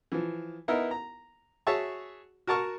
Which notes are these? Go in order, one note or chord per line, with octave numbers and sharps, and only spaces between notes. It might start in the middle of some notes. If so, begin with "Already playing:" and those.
E3 F3
B3 D#4 E4 A#4
A#5
F#4 G#4 C#5 E5 A5 C#6
F#4 A#4 A5 C#6 F6